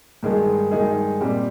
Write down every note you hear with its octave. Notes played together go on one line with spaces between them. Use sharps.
G2 D#3 G#3 D#4 G#4
G2 D#3 G#3 D#4 G#4
A#2 G3 C4 G4